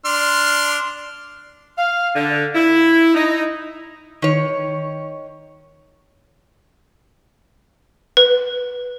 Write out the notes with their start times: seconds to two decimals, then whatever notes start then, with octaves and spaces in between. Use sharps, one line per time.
0.05 D4 C6 F6
1.78 F5
2.15 D3
2.55 E4
3.14 D#4
4.22 D#3 C#5
8.17 B4